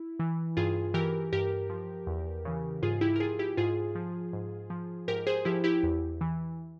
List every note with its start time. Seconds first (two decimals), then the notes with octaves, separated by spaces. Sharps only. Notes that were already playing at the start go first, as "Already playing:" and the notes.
Already playing: E4
0.20 E3
0.57 G2 F4 G#4
0.94 E3 G4 A#4
1.33 G2 G4 A#4
1.70 F3
2.07 E2
2.45 C#3 E3
2.82 G#2 F4 G#4
3.01 E4 G4
3.16 A#4
3.20 F3 F4 G#4
3.39 E4 G4
3.57 G#2 F4 G#4
3.95 F3
4.33 G#2
4.70 F3
5.08 G#2 G4 A#4
5.27 G#4 C5
5.45 F3 E4 G4
5.64 E4 G4
5.83 E2
6.21 E3